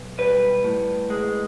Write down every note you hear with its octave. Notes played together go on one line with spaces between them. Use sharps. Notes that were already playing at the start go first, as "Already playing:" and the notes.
Already playing: B1
G3 B4
A2
G#3